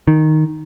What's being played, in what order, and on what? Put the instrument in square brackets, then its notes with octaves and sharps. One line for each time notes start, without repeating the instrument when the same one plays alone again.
[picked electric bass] D#3